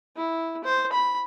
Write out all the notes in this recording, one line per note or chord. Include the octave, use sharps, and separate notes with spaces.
E4
C5
B5